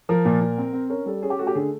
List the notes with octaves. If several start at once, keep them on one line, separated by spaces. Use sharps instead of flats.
F3 A#4
A#2
A#2
C4
C4
C#4 A#4
G3 A4
C#4 G#4
G4
A3 F#4
G4
D3 G#4